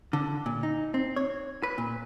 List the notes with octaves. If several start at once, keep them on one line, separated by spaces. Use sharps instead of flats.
D3
A#2
D#4
C4
C#5
B4
A#2